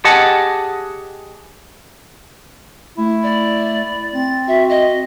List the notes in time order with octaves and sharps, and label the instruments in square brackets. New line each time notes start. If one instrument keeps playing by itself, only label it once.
[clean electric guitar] G4 G#4 D#5 F#5 A5
[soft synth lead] A3 [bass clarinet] E4
[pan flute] D5
[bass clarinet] C4 [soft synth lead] A6
[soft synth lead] F#4 [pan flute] E5
[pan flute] D#5